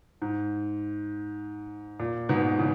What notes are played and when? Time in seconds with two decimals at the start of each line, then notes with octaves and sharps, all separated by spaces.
0.22 G#2
2.00 A#2
2.29 G#2 B2
2.59 C#3 E3